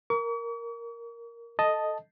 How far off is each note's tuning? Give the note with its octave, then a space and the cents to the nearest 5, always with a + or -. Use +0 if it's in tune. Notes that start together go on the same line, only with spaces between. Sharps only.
A#4 +0 C#6 +45
A4 +0 D#5 +0 A5 +0